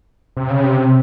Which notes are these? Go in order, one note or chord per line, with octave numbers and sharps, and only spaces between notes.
C3
C#3
C3